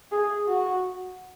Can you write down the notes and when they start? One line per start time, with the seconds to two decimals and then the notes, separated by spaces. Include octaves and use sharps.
0.12 G#4
0.48 F#4